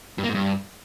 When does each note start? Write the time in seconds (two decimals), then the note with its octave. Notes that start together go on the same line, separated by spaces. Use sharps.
0.18 G2
0.24 A#3
0.29 G#2
0.34 G2